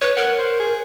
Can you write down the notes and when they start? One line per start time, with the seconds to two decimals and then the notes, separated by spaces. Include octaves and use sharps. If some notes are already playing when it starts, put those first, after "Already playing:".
0.01 B4 C#5
0.17 A#4 F#5
0.38 C5
0.59 G#4